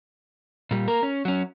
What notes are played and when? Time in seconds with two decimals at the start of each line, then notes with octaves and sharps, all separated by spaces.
0.71 A#2 G3
0.88 A#3 A#4
1.03 C#4
1.25 F#3 C#4